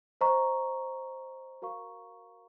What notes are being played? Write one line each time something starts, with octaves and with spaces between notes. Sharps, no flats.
C5 D#5 A#5 C#6
F#4 A#4 F5 A#5 C#6